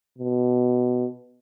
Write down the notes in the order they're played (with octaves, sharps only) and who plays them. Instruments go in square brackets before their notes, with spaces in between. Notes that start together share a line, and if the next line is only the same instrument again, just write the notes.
[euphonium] B2